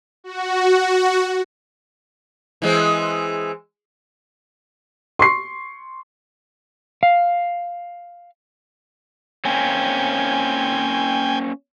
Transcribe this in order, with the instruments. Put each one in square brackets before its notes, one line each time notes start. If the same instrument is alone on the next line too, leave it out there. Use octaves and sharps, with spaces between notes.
[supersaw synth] F#4
[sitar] E3 G#3 C4
[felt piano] C6 C#6 C7
[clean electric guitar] F5
[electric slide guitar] A#3 C4 C#4 [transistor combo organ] G5 G#5